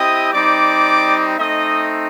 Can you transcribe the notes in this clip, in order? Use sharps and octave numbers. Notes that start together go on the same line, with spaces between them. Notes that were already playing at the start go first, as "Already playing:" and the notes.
Already playing: C4 E4 G4 D#5 D#6
G3 C4 D#4 D5 D6
A3 C4 D#4 D#5 D#6